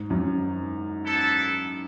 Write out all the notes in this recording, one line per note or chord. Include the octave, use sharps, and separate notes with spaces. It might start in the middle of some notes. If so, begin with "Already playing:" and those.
Already playing: G#2
F#2
B3 E4 A4